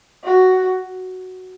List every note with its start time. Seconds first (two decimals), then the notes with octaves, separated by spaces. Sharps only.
0.24 F#4